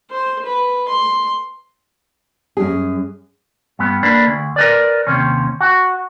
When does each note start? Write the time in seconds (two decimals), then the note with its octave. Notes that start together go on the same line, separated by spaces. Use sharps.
0.10 C5
0.45 B4
0.88 C6
2.57 F#2 G#4
3.79 G2 B3
4.03 A#3 D4 B4
4.27 D2
4.56 A#4 B4 D5
5.07 D#2 C3 C#4
5.61 F#4